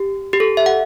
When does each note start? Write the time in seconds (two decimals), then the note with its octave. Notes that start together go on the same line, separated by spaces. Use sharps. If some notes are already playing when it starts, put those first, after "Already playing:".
Already playing: G4
0.33 G4
0.40 A4
0.57 E5
0.66 F#5